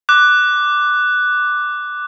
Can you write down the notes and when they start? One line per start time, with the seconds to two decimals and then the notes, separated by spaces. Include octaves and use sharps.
0.09 D6 F#6